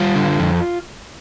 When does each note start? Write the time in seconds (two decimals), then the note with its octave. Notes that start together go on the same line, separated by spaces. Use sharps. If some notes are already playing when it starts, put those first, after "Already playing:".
Already playing: G3 F4
0.15 D3
0.39 F2